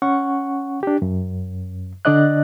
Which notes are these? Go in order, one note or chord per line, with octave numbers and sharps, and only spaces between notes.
C#4 F#5 C#6
D4 G4
F#2
D3 D4 D5 D#5 F#6